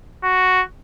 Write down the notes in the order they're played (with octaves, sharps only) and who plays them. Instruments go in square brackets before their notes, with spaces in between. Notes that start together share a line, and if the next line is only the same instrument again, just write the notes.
[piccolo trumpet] F#4